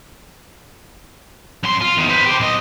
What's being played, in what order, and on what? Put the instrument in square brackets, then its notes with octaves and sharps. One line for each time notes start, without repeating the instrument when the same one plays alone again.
[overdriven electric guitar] F#2 C6
F4
E2 D#3
B4 C5
G4 C5
B1 D#5